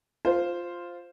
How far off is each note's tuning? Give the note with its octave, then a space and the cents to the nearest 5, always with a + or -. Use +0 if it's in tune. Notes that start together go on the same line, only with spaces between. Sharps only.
F4 +0 C5 +0